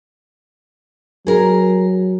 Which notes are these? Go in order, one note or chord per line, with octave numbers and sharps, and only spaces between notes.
F#3 G#4 A#4